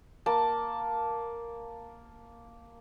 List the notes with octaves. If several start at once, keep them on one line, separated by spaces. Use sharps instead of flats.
A#3 A5